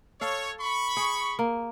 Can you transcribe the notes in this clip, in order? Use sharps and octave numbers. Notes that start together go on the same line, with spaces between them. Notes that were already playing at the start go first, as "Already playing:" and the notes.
A4 C#5 F5
B5 C#6
G#4
A#3